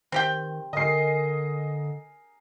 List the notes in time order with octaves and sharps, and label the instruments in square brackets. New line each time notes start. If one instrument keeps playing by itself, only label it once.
[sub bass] D#3 [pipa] C4 G4 G5
[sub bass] D3 [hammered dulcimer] A#4 G#5 [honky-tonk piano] D#5 C7